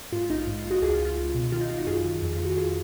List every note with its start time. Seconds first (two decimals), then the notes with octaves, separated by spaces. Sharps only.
0.12 G#2 F4
0.30 A#1 D#4
0.38 F4
0.47 G#2
0.59 F4
0.64 A#1
0.71 D#4 F#4
0.82 C#2 F4 G#4
0.93 F4
1.00 C#2
1.05 F4
1.17 C#2
1.35 B2
1.52 D#3 F4
1.61 D#4
1.69 G#1 F4
1.78 D#4 F#4
1.87 F#2 F4 G#4
2.04 D#3
2.22 F2
2.33 F4
2.40 D#3
2.45 F#4
2.57 F2 F4 G#4